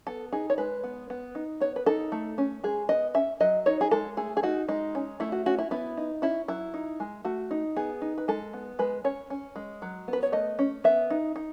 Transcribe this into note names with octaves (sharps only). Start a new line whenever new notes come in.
B3 A4
D#4 G#4
C#5
G#3 B4
B3
B3
D#4
B3 C#5
B4
D#4 A4
A3
C#4
G#3 G#4
B3 D#5
C#4 E5
F#3 D#5
D#4 C#5
G#4
G#3 A4
A3 G#4
G#4
D#4 F#4
G#3 D#4
C#4
A3 E4
F#4
C#4 F#4
E4
B3 E4
D#4
C#4 E4
F#3 E4
D#4
G#3
A3 F#4
D#4
B3 G#4
D#4
B4
G#3 A4
B3
G#3 B4
C#4 C#5
C#4
G#3
F#3
B3
B4
C#5
A3 D#5
C#4
B3 E5
D#4
D#4